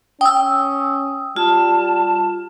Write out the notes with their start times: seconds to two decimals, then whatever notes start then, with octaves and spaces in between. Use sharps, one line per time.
0.21 C#4 G5 D#6 E6
1.36 G3 F4 A5